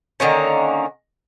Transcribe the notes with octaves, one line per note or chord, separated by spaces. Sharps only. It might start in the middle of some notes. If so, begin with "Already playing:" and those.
D3 D#3 A#3 C#4